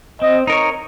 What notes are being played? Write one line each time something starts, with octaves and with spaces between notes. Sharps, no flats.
C4 D#5
D#4 A#4 C#5